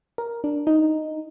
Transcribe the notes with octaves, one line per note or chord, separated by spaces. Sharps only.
A#4
D4
D#4